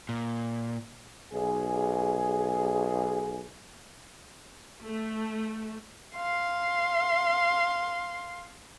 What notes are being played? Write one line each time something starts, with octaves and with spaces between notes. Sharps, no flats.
A#2
B1 G#4
A3
F5 C6